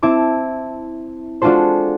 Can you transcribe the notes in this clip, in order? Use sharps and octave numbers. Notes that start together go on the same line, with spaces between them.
C4 E4 A5 D6
G#3 D4 F4 F#4 A4 C5